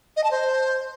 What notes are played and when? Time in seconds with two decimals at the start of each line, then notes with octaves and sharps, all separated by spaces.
0.17 D#5
0.24 A5
0.31 C5